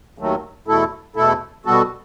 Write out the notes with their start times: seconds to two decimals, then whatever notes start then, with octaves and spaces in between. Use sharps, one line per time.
0.18 D#2 D#3 F#3 A3
0.67 E2 B2 A3 E4 A4
1.16 E2 B2 A3 E4 A4
1.65 B2 G3 B3 F#4 A4